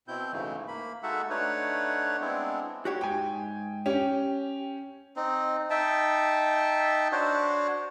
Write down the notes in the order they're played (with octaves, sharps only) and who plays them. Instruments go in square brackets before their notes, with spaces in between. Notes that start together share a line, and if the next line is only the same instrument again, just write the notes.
[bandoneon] B2 C4 E4 G6
G#2 C#3 E3 A3
A#3 B5
G#3 D#4 F#4 A4 E5 F#5
A3 D4 D#4 B4 C#5 F#5
G#3 B3 C4 D4 E4
[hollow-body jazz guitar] F#4 G4 C#5
[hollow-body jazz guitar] G#2 [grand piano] G5 G#5
[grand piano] C#4 G5 [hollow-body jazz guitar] G4
[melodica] C4 D#4
D#4 E5 G5 A5
D4 F#4 C5 C#5